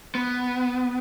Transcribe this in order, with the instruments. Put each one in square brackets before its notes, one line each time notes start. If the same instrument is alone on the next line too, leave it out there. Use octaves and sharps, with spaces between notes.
[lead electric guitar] B3